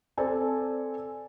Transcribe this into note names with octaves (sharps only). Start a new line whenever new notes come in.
C4 A4 C5 D5 G#5 A5